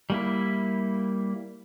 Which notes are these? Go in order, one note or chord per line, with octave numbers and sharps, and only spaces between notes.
G3 A#3 E4